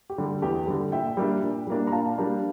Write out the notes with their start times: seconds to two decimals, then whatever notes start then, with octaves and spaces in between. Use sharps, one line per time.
0.10 G4
0.18 D3 G3
0.25 A4
0.42 E2 G4
0.67 D3 G3 A4
0.92 A#2 E5 G5
1.17 G3 A#3 D4
1.43 A#2
1.67 G3 A#3 D4
1.87 A#5
1.92 A#2 F5 A5
2.18 G3 A#3 D4